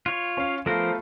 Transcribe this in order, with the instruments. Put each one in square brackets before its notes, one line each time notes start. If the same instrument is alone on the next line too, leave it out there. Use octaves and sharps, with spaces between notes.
[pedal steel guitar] F4 C#5
[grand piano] C#4 F5
[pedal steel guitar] F3 A#4 C5 [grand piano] A3 B3 F4